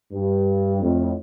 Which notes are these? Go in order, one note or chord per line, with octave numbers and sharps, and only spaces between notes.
G2
F2 A2